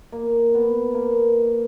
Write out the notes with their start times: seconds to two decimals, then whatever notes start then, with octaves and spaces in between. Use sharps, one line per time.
0.12 A#3
0.54 B3
0.94 A#3